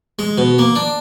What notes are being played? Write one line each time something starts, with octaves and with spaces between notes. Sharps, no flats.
G#3
B2
A#3
D4